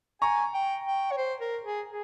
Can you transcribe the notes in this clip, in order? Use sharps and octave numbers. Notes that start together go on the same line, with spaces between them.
G#5 A#5 C#6
G5
G5
C#5
C5
A#4
G#4
G#4